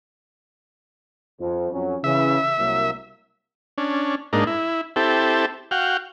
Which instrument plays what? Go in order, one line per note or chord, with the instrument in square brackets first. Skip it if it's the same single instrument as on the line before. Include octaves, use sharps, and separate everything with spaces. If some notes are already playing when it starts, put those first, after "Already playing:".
[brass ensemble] F2
F2 F#3 C#4
[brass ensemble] C#3 E3 [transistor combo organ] E5
[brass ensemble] C2 F#3 A#3
[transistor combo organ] C#4 D4
G#2 A#3 D4 D#4
E4
C4 E4 G4 A4
F#4 F5 G5